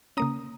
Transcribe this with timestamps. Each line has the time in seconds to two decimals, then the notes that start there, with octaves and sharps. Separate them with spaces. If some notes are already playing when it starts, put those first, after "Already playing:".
0.17 C#3 A#3 C#4 A#5 D#6